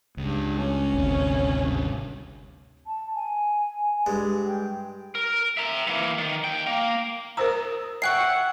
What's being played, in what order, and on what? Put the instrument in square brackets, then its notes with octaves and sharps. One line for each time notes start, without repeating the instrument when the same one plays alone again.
[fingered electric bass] C#2 [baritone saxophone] G2
[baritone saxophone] C#4
[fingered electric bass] G#1 D2 C3
[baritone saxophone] G2
[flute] A5
G#5
[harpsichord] G2 G#3
[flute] G5
[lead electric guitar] A#4
E5 A#5
E3 A#3
D#3
D#2 G5
A#3
[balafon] A#4 C5 A#5 [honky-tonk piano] D#6 E6 E7
[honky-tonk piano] C#5 G5 [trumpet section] E5 F#5 [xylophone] C#6 F#6 C7